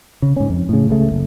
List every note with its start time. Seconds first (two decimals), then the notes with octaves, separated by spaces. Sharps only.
0.22 C#3
0.36 G#2 C#4
0.50 F2
0.69 A2 C#3
0.89 C#2 C#3 A3
1.12 F#1